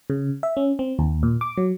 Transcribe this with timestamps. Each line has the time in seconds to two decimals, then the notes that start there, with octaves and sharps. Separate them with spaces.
0.10 C#3
0.43 E5
0.57 C#4
0.79 C4
0.99 D#2
1.23 A#2
1.41 D6
1.57 F#3